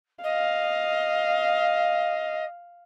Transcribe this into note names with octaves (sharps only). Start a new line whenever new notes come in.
D#5 F5